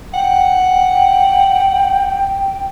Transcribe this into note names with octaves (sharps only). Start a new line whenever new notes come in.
F#5 G5